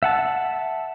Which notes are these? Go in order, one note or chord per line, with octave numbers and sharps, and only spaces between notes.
E5 F#5 A5